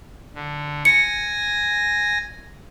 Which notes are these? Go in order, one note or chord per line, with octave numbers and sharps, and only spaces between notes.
D3
G#5 A#6 C#7